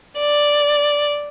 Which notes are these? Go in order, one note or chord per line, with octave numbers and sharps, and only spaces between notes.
D5